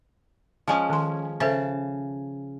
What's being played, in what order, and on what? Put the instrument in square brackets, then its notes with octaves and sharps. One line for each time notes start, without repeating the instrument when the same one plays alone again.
[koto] F3 G#3 C#4
[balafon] D#3 C6
[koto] C#3 A5 [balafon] A4 C5 E5